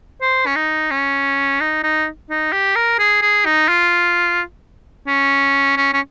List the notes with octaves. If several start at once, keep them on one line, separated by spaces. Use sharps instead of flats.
C5
C#4
D#4
C#4
D#4
D#4
D#4
G4
A#4
G#4
G#4
D#4
F4
C#4
C#4
C#4